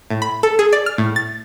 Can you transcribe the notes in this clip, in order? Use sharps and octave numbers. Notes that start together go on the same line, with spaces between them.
A2
B5
A4
G#4
D5
F6
A2
A6